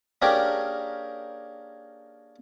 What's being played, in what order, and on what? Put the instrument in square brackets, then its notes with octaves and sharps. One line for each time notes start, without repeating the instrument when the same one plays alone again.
[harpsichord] A#3 C#4 D4 G4 G#4 A#4